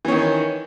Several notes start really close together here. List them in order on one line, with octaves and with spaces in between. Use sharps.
E3 C#4 D#3